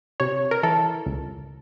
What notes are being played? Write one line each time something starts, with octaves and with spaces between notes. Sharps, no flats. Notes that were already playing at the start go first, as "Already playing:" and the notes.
C3 C#5
A#4
E3 A4
C#2